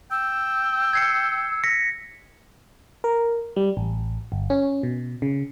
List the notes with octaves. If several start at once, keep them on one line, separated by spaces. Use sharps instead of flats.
G5 E6
G#6 C7 C#7
A#6 B6 C#7
A#4
G3
A1
G1
C#4
B2
C#3